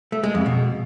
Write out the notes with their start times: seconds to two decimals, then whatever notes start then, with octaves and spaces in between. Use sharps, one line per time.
0.12 A3
0.23 G#3
0.35 F2
0.46 B2